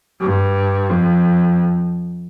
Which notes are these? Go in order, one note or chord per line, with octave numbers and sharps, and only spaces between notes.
G2
F2